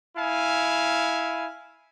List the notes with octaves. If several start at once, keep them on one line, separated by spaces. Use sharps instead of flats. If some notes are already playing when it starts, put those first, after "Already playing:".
E4 F5 G#5